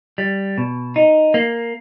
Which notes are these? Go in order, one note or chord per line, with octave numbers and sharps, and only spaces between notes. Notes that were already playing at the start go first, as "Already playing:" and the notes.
G3
B2
D#4
A#3